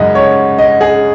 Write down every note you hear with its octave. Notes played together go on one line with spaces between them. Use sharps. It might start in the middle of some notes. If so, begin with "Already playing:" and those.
Already playing: F#2 C#3 G#3 D#4 D#5 F#5
C#5
D#5
G#4